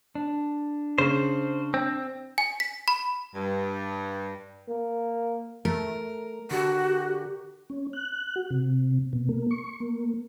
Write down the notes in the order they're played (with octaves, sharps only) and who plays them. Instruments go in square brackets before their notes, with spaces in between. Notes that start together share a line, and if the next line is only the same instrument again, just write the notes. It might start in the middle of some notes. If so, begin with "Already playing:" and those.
[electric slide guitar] D4
[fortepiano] C#3 [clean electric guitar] C5
[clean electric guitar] C4
[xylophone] G#5
B6
B5
[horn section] G2
[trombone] A#3
[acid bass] A3 [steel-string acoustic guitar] A#4
[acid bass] D3 [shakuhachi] F#4 [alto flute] G4
[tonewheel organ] C#4
F#6
F#4
C3
B2
A#3
C#6
A#3